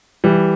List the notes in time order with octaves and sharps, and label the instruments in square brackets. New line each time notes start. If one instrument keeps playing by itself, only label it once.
[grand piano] E3 G3